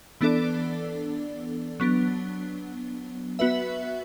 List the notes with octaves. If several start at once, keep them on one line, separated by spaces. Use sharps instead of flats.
E3 B3 D4 A4 D5
F#3 B3 D4
B3 F#4 B4 E5